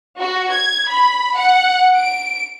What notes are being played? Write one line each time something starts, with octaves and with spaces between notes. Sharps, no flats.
F#4
G#6
B5
F#5
D7